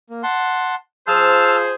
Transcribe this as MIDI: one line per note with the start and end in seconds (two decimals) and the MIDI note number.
0.10 0.22 58
0.23 0.75 78
0.23 0.75 81
0.23 0.75 84
1.07 1.74 53
1.07 1.74 68
1.07 1.74 72
1.07 1.56 81
1.07 1.56 88
1.07 1.56 89